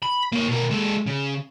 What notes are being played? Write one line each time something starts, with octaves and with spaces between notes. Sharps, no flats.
B5
A#3 C#5
B2 A#4
G#3 A4
C#3